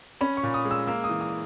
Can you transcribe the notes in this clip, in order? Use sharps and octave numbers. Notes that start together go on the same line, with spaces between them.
C#4 B5
C#6
A#2
D#6
G#3
E6
A#3 E6
D#6
E3
D#6